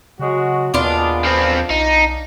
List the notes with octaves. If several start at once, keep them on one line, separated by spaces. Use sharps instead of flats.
C#3 F#3 G#3 F#4
D#2 A#2 G#3 B3 D4 F4
F3 C4
B1 D#4